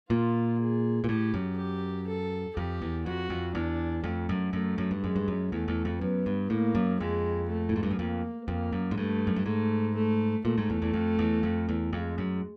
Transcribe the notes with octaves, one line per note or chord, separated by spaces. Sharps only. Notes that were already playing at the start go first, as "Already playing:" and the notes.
A#2 F4
G#4
A#2
A2 G4
F#2
G4
A4
F2 G4
E2
F2 F#4
F2
E2 D4
F2 A3
F#2
F#2 A3
F#2
G2
F#2 G#3
G2
F#2
E2 A3
E2
F2
F#2 B3
G2
A2 A#3
F#2
F2 G#3
A3
A2
G#2
G2
F#2
F2 A#3
F2 A#3
F#2
G#2
G2 A3
F#2
G2
G#2 A3
A3
A#2 A3
G#2
E2
E2
F2
E2
F2
E2
F2 G#3
F#2